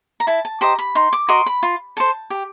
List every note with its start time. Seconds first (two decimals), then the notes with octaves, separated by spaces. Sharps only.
0.20 A#5
0.27 E4 A5
0.45 A5
0.61 G4 C5 D#5 A#5
0.79 B5
0.95 D#4 C6
1.13 D6
1.28 F#4 A#4 D#5 C6
1.46 B5
1.63 F4
1.97 A4 C5 A5
2.30 G4